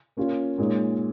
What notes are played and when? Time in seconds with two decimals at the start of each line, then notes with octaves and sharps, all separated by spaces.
0.17 A#3 C#4 F4
0.58 A#2 G#3 D#4 C#5